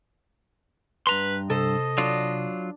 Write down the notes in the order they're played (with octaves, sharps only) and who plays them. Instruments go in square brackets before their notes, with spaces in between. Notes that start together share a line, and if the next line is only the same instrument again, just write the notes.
[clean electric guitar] G2 A#5 C6 [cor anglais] B4
[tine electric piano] C3 [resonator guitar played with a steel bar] A4 C5 [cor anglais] D#5
[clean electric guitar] F#3 F4 [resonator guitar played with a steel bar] D4